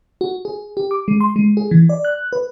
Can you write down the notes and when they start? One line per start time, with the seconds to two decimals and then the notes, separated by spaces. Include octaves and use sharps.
0.21 F#4
0.45 G#4
0.77 G4
0.91 D6
1.08 G#3
1.21 C6
1.36 G#3
1.57 G#4
1.71 E3
1.89 D5
2.05 F#6
2.33 B4